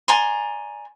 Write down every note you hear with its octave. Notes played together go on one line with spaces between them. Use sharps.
D5 G#5 A#5 C6